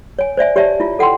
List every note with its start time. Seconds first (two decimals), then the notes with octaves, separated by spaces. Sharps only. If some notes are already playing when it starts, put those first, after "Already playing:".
0.19 C#5 G#5
0.37 C5 D5 E5 G#5
0.56 G4 C#5 D5 E5 A5
0.80 E4 F4
0.99 A4 F#5 G5 C6